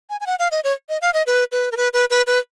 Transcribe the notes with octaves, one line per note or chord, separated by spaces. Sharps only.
G#5
G#5
F#5
F5
D#5
C#5
D#5
F5
D#5
B4
B4
A#4
B4
B4
B4
B4